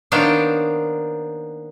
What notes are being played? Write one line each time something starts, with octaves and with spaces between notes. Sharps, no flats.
D#3 A#3 B3 D4 C5 C#5